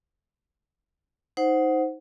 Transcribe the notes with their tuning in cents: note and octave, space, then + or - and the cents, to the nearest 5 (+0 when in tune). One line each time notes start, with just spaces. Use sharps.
D#4 +15 C5 +0 F#5 +0